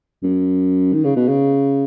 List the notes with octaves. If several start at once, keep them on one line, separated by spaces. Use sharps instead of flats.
F#2
D#3
C#3
B2
C#3